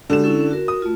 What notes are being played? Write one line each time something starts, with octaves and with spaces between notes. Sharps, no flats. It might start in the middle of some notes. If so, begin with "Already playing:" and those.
D3 G#3 F#4 G4 E7
C#4 E4 A4
F#4 A#4
D#6
A3 F4